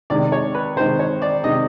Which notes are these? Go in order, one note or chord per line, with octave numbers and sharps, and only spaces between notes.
C3 D#3 G#3 D5
C#5
B4
C3 D#3 G#3 C5
C#5
D5
C3 D#3 G#3 D#5